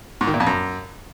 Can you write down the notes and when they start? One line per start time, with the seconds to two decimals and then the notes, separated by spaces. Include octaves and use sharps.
0.21 G#2
0.27 D#3
0.34 A#2
0.40 F2
0.47 F#2